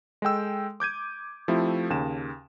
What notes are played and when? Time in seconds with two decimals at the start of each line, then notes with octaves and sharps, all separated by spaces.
0.22 G#3 A4 G5 E6
0.80 D6 G6 G#6 D#7
1.48 F3 A3 C4 E4 G4
1.90 D#2 C#3 E7